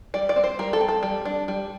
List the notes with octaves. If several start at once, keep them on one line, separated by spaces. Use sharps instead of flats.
G3 D5
D5
C4
C5
G3 A#4
A4
C4
A4
G3
D4
G3